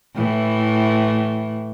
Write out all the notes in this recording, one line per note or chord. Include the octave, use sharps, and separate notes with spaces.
A2 E3